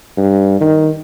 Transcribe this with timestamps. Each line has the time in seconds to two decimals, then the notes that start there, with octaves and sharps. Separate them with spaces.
0.17 G2
0.61 D#3